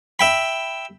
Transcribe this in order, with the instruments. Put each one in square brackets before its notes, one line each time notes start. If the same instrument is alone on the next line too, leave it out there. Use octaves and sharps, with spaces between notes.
[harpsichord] E5 G5 B5